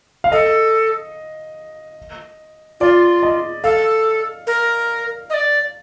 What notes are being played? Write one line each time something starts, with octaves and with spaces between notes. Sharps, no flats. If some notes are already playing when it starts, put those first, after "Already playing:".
F5
A4 D#5
F4 D5
D#5
A4 F5
A#4
D#5
D5